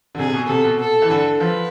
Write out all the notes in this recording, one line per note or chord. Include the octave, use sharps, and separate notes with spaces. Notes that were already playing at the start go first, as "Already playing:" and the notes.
D3
C3 G#4
B2
C3 A4
B2
A4
E3
D3
F3 B4